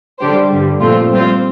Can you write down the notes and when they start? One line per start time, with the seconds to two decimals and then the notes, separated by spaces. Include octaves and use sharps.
0.19 D3 G3 D4 G4 C5
0.50 G2 D3 G3
0.81 A#2 F3 A3 C4 F4
1.12 G3 C4 F4 C5